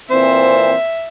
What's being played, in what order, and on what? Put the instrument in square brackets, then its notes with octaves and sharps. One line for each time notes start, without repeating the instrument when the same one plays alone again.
[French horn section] A#2 E3 C4 [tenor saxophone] C5 [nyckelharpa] E5